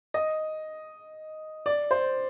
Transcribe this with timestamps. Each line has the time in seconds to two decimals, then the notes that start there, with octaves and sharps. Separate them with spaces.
0.14 D#5
1.66 D5
1.91 C5